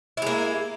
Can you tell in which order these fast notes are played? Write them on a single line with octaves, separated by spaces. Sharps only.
E4 G#3 A#3